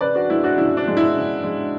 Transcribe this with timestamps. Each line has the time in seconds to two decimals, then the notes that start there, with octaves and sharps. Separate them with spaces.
0.01 C#3 B4 D5
0.15 D4 F#4
0.30 G#3 E4
0.43 D4 F#4
0.57 C#3 E4
0.77 D4
0.87 G#3
0.97 E4
1.15 C#3
1.43 G#3